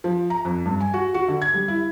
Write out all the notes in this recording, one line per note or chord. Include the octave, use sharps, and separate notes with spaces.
F3
A#5
F2
G2
G#5
F#4
F#4
D3
G#6
G3
E4